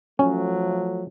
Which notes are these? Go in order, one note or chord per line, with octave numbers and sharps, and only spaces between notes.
F3 F#3 A3 C#4